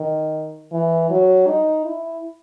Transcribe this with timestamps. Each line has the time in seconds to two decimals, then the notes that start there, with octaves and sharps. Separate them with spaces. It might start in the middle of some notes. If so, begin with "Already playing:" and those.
Already playing: D#3
0.72 E3
1.10 F#3
1.47 D#4
1.85 E4